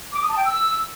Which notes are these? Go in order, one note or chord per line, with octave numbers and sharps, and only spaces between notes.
D6
D#6
A5
G5
E6